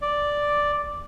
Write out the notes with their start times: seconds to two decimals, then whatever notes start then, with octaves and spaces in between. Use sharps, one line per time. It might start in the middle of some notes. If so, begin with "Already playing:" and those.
0.02 D5